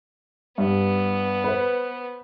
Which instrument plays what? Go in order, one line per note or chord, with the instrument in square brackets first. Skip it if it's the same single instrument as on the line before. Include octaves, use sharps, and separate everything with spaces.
[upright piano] G2 [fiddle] B3
[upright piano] B4 C5